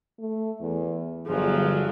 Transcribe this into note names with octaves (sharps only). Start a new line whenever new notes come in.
A3
E2
G1 F3 F#3 G#4